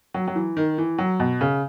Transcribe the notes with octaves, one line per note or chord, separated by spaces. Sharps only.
F#3
F#3
E3
D#3
E3
F#3
B2
C#3